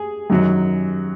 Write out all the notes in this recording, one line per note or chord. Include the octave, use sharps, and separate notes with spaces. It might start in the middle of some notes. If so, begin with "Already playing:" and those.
Already playing: G#4
F#2 D#3 F#3